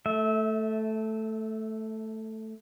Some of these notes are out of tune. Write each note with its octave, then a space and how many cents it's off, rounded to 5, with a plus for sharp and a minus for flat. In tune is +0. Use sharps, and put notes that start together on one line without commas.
A3 +0 E5 -25